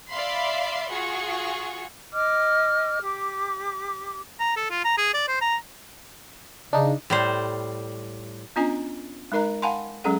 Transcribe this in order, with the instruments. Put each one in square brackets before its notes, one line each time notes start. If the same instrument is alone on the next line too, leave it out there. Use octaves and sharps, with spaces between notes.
[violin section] D5 E5 F5 B5 C6
F4 F#4 G#4 C#6
[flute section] D#5 D6 F6
G4 D6
[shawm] A#5
A4
F4
A#5
G#4
D5
C5
A#5
[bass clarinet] C#3 [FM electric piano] D4 D#4
[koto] A2 G3 C5
[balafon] B3 C#4 D4 F4 D#5 G#5
G#3 D#4 A#4 D#5 A#5
F5 F#5 G#5 A5 B5 C6
F#3 G#3 C#4 G#4 A4 F#5